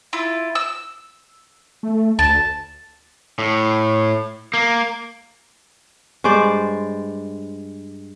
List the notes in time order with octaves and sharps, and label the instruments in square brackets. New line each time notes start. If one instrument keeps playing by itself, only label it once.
[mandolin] E4 F4
E6
[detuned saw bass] A3
[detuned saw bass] D2 [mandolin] A5
[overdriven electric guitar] A2
A#3
[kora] G2 G#3 C5 D5